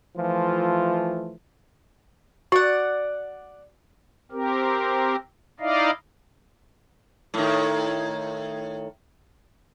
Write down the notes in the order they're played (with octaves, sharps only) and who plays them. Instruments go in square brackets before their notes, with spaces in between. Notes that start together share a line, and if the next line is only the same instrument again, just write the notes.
[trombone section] E3 F3 A3 F4
[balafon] F#4 [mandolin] D5 F#5
[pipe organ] C4 G4 A#4
D#4 E4 D5 D#5 F5
[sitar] A2 D#3